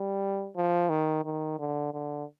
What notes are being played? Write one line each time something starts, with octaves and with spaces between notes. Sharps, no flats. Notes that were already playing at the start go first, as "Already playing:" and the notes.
Already playing: G3
F3
D#3
D#3
D3
D3